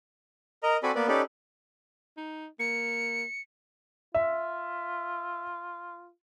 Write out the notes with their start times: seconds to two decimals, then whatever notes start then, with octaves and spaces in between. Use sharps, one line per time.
0.63 A#4 D#5 A#5
0.83 C4 F#4 A4 D5 G#5 B5
0.95 A#3 B3 B4 D5
1.08 C#4 D#4 G4 A4 B4 D5
2.17 D#4
2.60 A#3 C#7
4.14 F4 E5